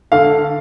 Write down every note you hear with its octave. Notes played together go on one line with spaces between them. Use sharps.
D3 F5